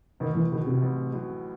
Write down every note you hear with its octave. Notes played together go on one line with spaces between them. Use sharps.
A1 D#3
E3
A2 D#3 F#3
C3
A1
A2 F#3